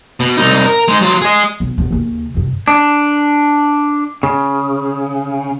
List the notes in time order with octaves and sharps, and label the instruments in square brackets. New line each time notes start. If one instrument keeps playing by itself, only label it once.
[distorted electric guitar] B2
C2 D#4
A#4
G#3 D#4
F#3 F4
G#4 D#5
[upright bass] B1
F#2 B3
D#2 C#3
G2 C3
[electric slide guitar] D4
C#3